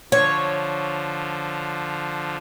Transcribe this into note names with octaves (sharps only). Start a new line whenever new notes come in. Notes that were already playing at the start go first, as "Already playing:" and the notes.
D3 F3 C#5